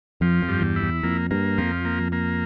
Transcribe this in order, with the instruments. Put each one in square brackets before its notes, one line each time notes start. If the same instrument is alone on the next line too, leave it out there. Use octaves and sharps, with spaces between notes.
[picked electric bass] F2 [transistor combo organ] F3
[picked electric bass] F2
[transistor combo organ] G2
[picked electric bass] E2
[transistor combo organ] E4
[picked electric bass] E2
[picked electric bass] F2 [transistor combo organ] A#3
[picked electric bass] G2 [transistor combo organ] A#3
[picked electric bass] F2 [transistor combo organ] F3
[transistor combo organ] A#3
A#3